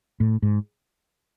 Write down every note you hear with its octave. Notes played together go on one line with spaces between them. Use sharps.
A2
G#2